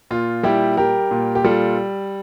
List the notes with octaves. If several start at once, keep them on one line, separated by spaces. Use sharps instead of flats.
A#2 F4
G3 E4 G4
G3 G4 A#4
A#2
G4
G3 F4 A4